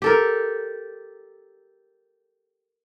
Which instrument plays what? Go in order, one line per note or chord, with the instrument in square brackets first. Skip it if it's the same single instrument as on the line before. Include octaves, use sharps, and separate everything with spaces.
[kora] G4 A4 A#4